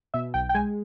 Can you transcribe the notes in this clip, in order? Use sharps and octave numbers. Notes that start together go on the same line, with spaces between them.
B2 E5
B1 G5
G5
G#3 G#5